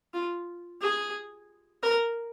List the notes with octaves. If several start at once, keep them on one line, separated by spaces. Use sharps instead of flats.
F4
G#4
A#4